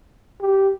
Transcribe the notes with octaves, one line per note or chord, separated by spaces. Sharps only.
G4